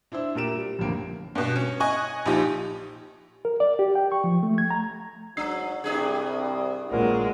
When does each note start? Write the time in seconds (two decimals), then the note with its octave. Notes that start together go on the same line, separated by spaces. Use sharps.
0.12 D4 E4 C5 E6
0.35 A#2 G4 A#4 D7 E7
0.55 G3
0.79 A1 F2 D3 A#3 D7
1.35 G2 B2
1.56 C#4
1.80 D#5 G#5 C#6 F#6
2.26 A#1 F3 D#4 G4
3.45 A#4
3.60 D5
3.79 G4
3.95 G5
4.12 C#6
4.24 F3
4.43 A3
4.58 G#6
4.70 A#5
5.37 G#2 F#3 D4 E6 C7
5.84 C2 G2 D4 G#4
6.91 A#1 A#2 F#3 G#3 C4 F#4 A#4